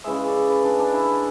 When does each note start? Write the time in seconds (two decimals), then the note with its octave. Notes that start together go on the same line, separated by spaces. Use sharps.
0.04 C#3 E3 G#3 E5
0.28 D5
0.50 B4
0.64 D4
0.79 D4
0.94 E4